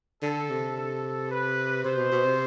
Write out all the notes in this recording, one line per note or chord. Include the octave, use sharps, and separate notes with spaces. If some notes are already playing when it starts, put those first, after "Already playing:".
D3 A4
C3
A4
B4
C3 C5
B2
B2
C3